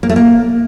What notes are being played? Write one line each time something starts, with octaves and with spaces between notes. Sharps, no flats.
A#3
A3
A#3